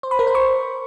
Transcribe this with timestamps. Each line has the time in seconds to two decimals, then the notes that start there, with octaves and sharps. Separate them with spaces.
0.03 C5
0.11 B5
0.19 A#4
0.27 C5
0.35 C#6